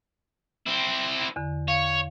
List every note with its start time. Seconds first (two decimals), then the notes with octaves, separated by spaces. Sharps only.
0.66 C4 E4
1.36 E2 D3
1.68 C#5 F5